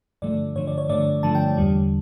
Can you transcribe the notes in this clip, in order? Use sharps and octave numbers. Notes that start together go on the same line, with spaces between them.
G2 D3 F3 A3 D5
G2 D3 F3 A3 C#5
D5
C#5
G2 D3 F3 A3 D5
G2 D3 F3 A3 A5
G5
E2 D3 G3